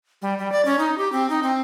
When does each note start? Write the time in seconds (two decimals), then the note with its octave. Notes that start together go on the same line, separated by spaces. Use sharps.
0.22 G3
0.38 G3
0.52 D5
0.65 C#4
0.79 D#4
0.98 G4
1.12 C4
1.30 D#4
1.43 C4